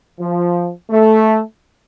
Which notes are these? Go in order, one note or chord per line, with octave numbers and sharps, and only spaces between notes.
F3
A3